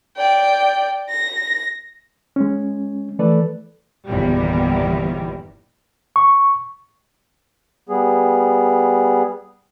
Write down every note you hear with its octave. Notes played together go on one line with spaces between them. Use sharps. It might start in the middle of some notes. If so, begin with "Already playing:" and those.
D5 G5
A#6
G#3 C#4
E3 A3 A4 B4 D5
G1 E2 A#2 D#3 E3 G3
C#6
G3 B3 G#4